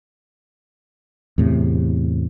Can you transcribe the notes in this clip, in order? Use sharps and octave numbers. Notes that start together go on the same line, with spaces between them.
E2 A2 C3